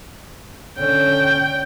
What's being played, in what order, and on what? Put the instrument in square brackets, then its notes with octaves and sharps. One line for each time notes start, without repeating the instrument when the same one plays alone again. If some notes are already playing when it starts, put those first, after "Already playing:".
[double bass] D3 C#4 [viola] G5